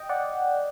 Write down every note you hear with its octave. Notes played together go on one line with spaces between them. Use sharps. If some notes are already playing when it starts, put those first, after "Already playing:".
Already playing: D#5 G5
D5 F#5